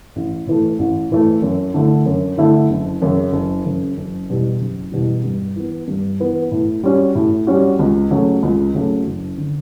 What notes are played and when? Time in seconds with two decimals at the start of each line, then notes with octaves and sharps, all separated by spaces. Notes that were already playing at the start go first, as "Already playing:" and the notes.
0.16 A1
0.47 A2 E3 A3
0.79 A1
1.11 A2 E3 A3
1.42 F#2
1.74 D3 A3 E4
2.06 F#2
2.38 D3 A3 E4
2.70 F#1
3.02 F#2 C#3
3.33 F#1
3.65 F#2 C#3
3.97 F#1
4.29 E2 B2 G3
4.61 F#1
4.92 E2 B2 G3
5.24 G2
5.56 E3 B3
5.88 G2
6.20 E3 B3
6.51 A2
6.83 G3 C#4 F#4
7.15 A2
7.47 G3 C#4 F#4
7.79 C#2
8.11 C#3 F#3 A3
8.43 C#2
8.74 C#3 F#3 A3
9.06 F#1
9.38 D3